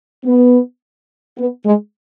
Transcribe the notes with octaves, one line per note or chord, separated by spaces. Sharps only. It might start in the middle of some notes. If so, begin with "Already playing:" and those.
B3
B3
G#3